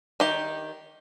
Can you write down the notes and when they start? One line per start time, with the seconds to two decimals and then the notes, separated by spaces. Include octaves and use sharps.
0.20 D#3 G4